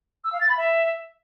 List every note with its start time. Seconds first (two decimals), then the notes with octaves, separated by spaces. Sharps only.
0.24 E6
0.32 F5
0.41 A6
0.49 B5
0.57 E5